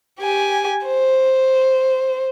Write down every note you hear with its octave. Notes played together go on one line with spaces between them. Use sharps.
G4 G#5
C5